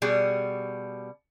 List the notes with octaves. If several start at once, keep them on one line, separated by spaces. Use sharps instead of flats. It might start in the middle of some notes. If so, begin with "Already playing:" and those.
B2 G3 G#4